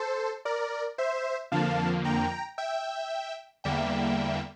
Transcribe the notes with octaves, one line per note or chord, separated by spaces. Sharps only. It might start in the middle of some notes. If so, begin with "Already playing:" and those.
Already playing: A4 C5
A#4 D5
C5 E5
F2 D3 F3 A#3 F5 A5
G5 A#5
E5 G5
E2 D3 G3 A#3 E5 G5